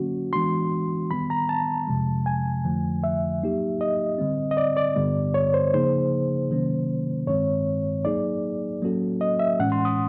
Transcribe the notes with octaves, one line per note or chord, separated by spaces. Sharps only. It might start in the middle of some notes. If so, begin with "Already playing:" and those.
Already playing: D3 F#3 A#3 C#4 F#4
E3 G#3 B3 D4 F#4 C6
D#3 G3 B3 B5
A#5
A5
F2 C3 F3 G#3
G#5
F2 D3 F3 A3
E5
F#3 A#3 D#4 G4
D#5
D3 G3 C4
D#5
D5
D5
G2 D3 G3 B3
C#5
C5
C#3 F3 A#3 D#4 G#4 C5
C3 D#3 F#3 A#3 C#4
G2 D#3 G#3 C4 C#5
F#3 A#3 D#4 G#4 D5
F#3 A#3 C#4 F#4 A4
D#5
E5
A2 E3 G#3 C#4 F#5
C6
D#6